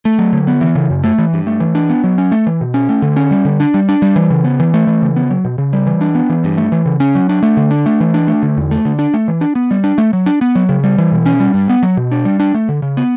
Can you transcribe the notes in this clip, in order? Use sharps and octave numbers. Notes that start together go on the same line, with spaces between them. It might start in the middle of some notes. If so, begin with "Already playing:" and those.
A3
F#3
D3
B3
E3
C#3
F#2
A3
E3
G2
A3
E3
D4
B3
F#3
C#4
A3
E3
B2
C#4
A3
D3
C#4
G3
D3
D4
G3
D4
G3
E3
C#3
B3
E3
A3
E3
C#3
B3
F#3
B2
C#3
G3
E3
D4
B3
E3
G2
A3
E3
C#3
C#4
F#3
D4
A3
D3
D4
A3
E3
D4
A3
D3
E2
A3
D3
D4
A3
E3
D4
B3
G3
D4
A3
F#3
D4
B3
F#3
C#3
G3
E3
B2
C#4
G3
G2
B3
F#3
B2
D4
G3
D4
A3
D3
C#3
B3